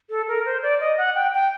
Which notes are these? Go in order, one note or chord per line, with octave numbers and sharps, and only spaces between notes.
A4
A#4
C5
D5
D#5
F#5
G5
G5